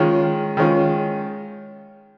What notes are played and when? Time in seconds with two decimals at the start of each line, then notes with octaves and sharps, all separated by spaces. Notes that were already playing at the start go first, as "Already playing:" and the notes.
Already playing: D#3 G#3 C#4 F4
0.57 D#3 G#3 C#4 F4